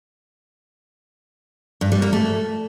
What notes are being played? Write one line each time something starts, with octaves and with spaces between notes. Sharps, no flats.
G2
G3
A#3
A3